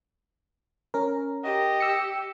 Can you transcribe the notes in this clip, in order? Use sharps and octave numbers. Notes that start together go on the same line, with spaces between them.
C#4 A#4
G4 D#5
E6 C#7